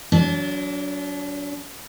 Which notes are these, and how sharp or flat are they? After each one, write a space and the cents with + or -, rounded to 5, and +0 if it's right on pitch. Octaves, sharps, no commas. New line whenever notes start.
F#3 +0 D4 -35